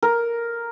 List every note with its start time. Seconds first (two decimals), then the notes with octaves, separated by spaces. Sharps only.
0.03 A#4